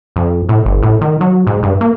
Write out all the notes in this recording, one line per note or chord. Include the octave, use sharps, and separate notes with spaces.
F2
A2
G1
A2
D#3
F#3
G#2
G2
A#3